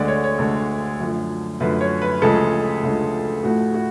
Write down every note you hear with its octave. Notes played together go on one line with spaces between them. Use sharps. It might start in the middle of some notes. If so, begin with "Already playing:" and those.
Already playing: D2 D3 G#3 D5
C#5
C#5
D2 D3 G#3 A4
F#2 D3 F3 A3
F#2 D3 F3 A3 B4
C#5
B4
D2 C#3 F3 G#3 A4
D2 C#3 F3 G#3
A2 F3 A3 F#4
F#4